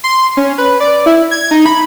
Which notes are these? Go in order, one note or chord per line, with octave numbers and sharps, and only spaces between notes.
C6
C#4
B4
D5
E4
G#6
D#4
B5